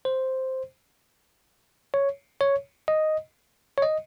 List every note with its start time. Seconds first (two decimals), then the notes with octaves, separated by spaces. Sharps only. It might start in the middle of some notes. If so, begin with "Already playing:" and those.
0.05 C5
1.94 C#5
2.41 C#5
2.88 D#5
3.78 C#5
3.82 D#5